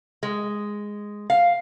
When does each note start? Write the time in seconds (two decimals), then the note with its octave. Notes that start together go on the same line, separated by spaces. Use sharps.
0.23 G#3
1.30 F5